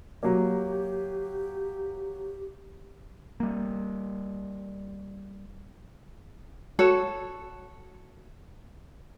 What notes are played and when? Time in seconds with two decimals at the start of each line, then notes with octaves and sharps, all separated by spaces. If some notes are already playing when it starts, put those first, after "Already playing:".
0.23 F#3 A#3 G4
3.40 G3 A#3
6.79 F#4 A4 C#5